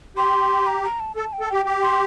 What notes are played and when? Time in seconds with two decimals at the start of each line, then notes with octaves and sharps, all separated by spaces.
0.17 G4 C6
0.66 A#5
0.83 A#5
1.00 A5
1.16 A4 A5
1.33 G5
1.40 A4
1.49 G4 G5
1.66 G4
1.82 C6